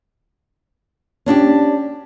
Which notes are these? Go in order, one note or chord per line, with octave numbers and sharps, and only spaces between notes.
C#4 D4 F#4 G4